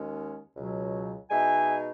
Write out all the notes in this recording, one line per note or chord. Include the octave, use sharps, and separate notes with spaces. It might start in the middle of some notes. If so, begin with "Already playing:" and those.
Already playing: D#2 D#3 G#3 C#4
C#2 B2 F#3
B2 G#3 D#4 E5 G#5